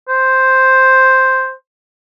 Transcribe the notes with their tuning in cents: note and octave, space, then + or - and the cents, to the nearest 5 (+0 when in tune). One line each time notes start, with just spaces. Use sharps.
C5 +5